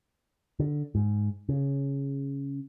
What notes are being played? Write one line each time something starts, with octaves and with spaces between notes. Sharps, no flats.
D3
G#2
C#3